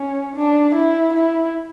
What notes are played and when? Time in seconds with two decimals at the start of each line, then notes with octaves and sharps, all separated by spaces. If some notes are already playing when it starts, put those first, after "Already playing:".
Already playing: C#4
0.36 D4
0.75 E4
1.13 E4